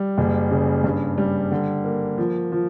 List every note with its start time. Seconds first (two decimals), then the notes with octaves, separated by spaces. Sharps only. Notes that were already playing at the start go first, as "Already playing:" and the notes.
Already playing: G3
0.18 F#1
0.51 C#3
0.84 G2
1.18 G3
1.51 D3
1.85 A#3
2.18 F3
2.52 F3